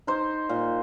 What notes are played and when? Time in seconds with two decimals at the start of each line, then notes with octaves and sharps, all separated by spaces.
0.07 D#4 C5
0.49 A#2